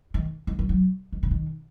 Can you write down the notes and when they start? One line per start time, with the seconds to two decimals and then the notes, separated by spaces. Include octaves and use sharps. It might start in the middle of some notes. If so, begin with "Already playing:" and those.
0.14 D#3
0.47 D#3
0.59 F#3
0.69 F#3
1.12 D#3
1.23 C#3
1.31 D#3